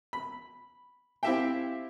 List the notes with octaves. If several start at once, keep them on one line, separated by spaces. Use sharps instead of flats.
B5
C4 E4 G4 E5 F5 G5